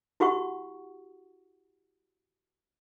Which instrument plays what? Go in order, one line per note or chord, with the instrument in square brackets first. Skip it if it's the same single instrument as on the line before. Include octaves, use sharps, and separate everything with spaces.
[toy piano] E4 F#4 G4 F#5 C#6